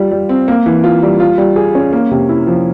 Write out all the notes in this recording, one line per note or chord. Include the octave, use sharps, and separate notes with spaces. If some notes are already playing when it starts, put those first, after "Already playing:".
Already playing: G3 F4
G3
C4
A#3
E3
F4
G3
F4
G3
G#4
C#4
A#3
C3
E4
F3